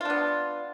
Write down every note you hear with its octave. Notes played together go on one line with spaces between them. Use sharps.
B3 D4 F4